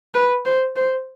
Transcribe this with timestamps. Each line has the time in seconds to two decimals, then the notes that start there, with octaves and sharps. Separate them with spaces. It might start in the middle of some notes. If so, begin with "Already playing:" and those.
0.14 B4
0.45 C5
0.76 C5